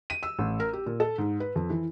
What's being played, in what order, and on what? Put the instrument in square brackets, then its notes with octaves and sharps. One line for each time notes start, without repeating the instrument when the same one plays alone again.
[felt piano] D#7
E6
A1
A#4
G4
A#2
A4
G#2
B4
F2
E3